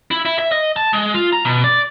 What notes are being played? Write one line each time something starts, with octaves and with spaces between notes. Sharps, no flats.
E4
E4
E5
D#5
A5
G#3
F4
A#5
B2
D5